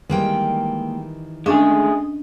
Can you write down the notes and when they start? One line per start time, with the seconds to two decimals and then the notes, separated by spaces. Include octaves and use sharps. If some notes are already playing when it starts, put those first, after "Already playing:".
0.09 D#3 E3 G3 G#3 A#3 G5
1.46 G#3 A3 C#4 D4 G#4 D#5 F5